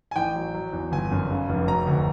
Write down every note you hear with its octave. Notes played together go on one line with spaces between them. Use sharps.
G#5
A1 G5
F#3
F#3
E2
G1 G#5
F#2
C#3
F1
F#3 A#5
D2